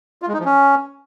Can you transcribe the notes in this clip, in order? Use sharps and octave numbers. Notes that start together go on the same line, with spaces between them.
F4
G#3
D#4
F3
C#4